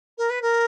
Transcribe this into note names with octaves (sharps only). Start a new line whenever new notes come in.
A#4
B4
A#4